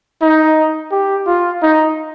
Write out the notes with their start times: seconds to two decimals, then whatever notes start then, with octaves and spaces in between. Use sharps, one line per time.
0.22 D#4
0.92 G4
1.27 F4
1.63 D#4